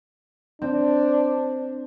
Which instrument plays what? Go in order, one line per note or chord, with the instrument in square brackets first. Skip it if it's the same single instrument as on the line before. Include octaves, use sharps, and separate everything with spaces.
[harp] C4 [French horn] D4